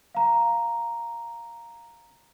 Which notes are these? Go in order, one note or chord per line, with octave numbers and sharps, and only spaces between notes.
F5 A#5